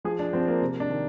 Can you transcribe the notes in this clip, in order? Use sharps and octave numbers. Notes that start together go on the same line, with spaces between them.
F3 G#4
D4
F3 C4
A#3
C3
D4
D#3